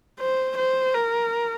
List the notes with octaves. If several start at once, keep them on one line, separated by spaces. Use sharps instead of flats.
C5
C5
A#4